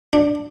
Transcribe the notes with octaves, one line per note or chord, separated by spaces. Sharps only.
D4